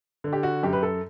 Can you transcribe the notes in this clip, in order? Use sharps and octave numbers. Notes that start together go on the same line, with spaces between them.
D3
G4
F#4
F#2 G4
B4
A4